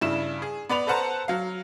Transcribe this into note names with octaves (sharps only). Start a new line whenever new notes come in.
G2 C#3 E4 E7
G#4
B3 D5 B5 F7
A4 B4 C5 F#5 A5 A#5
F#3 F5